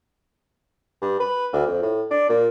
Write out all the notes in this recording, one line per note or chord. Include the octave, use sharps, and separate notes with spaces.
G2
B4
D2
F2
A2
D4
A#2